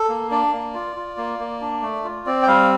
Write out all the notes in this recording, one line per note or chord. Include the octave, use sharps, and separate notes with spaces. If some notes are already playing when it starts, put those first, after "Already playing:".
Already playing: A4
A#3
D4 D5
A#3
F4
F4
A#3
A#3
D4
A3
F4
C4 D5
G5
G3 F5